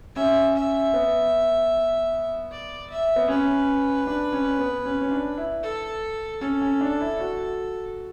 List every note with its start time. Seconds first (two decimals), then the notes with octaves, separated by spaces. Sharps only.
0.15 C#4 E5
0.54 E5
0.94 B3
2.51 D5
2.90 E5
3.16 B3
3.28 C#4 B4
4.07 D4
4.33 C#4
4.59 B3
4.85 C#4
5.01 C#4
5.11 D4
5.38 E4
5.63 A4
6.41 C#4 A4
6.62 C#4
6.81 D4
7.01 E4
7.20 F#4